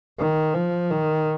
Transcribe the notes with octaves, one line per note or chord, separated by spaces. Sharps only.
D#3
F3
D#3